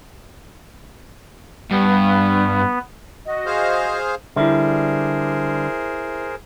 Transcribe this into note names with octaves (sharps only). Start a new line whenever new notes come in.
G2 B3
F#4 D#5
G#4 C5 F5
D3 G3 E4 G#4 A#4 C5 E5